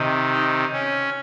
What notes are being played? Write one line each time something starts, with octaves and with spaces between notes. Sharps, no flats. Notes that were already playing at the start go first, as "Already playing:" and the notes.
Already playing: C3 D#3
D#4
C#4